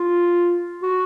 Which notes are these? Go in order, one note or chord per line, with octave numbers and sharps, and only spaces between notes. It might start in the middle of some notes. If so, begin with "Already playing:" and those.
Already playing: F4
F#4